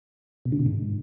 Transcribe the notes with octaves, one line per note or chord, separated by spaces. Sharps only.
B2
D3
B2
G#2